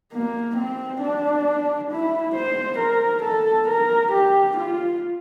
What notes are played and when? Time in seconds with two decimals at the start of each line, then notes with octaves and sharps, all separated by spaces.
0.13 A#3
0.57 C4
1.01 D4
1.91 E4
2.35 C5
2.79 A#4
3.23 A4
3.68 A#4
4.13 G4
4.57 F4